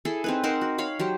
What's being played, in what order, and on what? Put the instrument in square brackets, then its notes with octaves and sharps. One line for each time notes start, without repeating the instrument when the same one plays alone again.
[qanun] E4 G#4 A4
C4 D#4 B4
D#4 A#4 C5 F#5
F#4
C#5 F5 B5
F#3 G4 C5